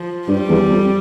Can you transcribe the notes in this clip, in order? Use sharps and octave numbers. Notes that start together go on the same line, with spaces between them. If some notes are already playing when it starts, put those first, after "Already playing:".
Already playing: F3
G2 G3
E2
F2